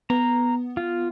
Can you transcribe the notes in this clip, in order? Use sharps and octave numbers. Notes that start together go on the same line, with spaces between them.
B3 A#5
F4